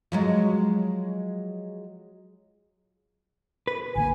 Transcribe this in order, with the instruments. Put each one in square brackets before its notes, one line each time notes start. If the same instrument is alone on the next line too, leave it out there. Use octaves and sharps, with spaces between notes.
[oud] F3 F#3 G#3
[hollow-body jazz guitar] B4
[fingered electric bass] A1 D3 A#3 [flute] G#5